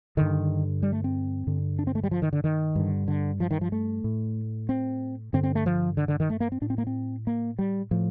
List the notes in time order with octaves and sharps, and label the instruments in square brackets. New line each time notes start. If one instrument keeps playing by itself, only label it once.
[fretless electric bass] G2 D3 D#3
G3
A3
C4
G2 D3
D4
C4
A3
G3
F3
D#3
D3
D#3
G2 D3
D3
F3
D#3
F3
A3
A2
C4
G2 D3 C4
C4
A3
F3
D3
D3
D#3
A3
A#3
C4
A2 D4
C4
A#3
C4
A#3
G3
A2 F3